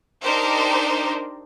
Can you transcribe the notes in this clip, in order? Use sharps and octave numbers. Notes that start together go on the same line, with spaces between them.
D4 D#4 G4 A#4 C5